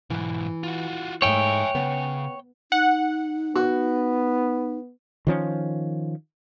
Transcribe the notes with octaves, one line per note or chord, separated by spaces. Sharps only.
B1 G#2 E3
F4 F#4
G#2 A3 C#5 E5 G5 G#5
C#3 B3
D#4 F#5
B3 F#4
D#3 F3 C#4